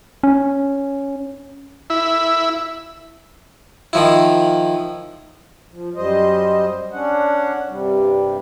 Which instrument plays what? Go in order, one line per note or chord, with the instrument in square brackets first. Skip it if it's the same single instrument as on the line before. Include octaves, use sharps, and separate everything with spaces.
[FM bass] C#4
[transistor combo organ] E4
[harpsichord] D#3 F3 E4
[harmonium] F3
F#2 G3 C5 D#5
C#4 D4 F#5
G2 C3 G3